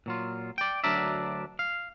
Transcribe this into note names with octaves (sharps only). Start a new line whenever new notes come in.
A#2 F#3 F4
D5 G5
D2 F#3 D4 A#4 D5 E5
F5